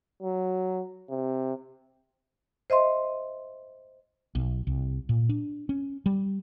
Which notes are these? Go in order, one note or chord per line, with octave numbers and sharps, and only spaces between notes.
F#3
C3
C5 D#5 E5 C6
B1
C2
A#2
D4
C#4
G3